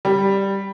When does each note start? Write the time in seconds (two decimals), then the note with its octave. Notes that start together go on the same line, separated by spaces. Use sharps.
0.05 G3